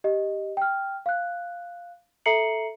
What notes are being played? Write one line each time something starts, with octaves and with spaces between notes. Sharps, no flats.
G4 D#5
G5 F6
F5 F#6
A4 E5 A#5 C7 C#7 F#7